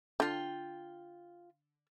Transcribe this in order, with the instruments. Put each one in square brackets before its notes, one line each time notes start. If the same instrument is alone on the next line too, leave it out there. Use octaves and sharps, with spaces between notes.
[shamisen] D3 [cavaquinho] F4 G5